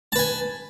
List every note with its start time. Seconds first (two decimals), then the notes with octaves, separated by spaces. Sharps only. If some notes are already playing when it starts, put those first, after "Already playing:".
0.12 A5
0.16 B4
0.19 G#5